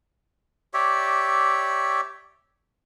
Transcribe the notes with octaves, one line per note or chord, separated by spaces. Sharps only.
G4 C#5 D5 E5